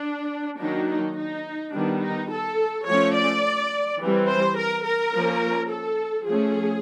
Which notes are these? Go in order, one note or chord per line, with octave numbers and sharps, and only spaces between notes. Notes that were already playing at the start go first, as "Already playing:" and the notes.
Already playing: D4
D#3 F#3 A#3 D4 D#4
D#4
D#4
D#3 G3 B3 D4
D#4
A4
F3 A3 C#4 C#5
D5
E3 G3 C4
C5
A#4
A#4
F3 A#3 C#4
A4
F3 A3 C#4 G#4